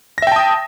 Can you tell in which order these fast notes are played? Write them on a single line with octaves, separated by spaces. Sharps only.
A#6 E5 G5 A5 D#6